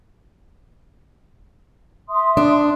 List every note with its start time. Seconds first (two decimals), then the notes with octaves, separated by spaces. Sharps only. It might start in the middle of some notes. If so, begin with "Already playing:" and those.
2.09 E5 C6 D#6
2.37 D4